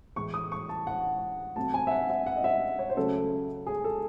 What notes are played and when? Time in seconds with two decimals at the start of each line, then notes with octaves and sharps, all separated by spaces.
0.16 A2 E3 G#3 C#6
0.34 D#6
0.52 C#6
0.69 A5
0.87 F#5
1.56 C3 F#3 A3 A5
1.74 G#5
1.87 E5
1.91 F#5
2.10 E5
2.26 F#5
2.36 D#5
2.44 E5
2.79 C#5
2.89 C5
2.97 C#3 F#3 A3 A4
3.67 G#4
3.84 A4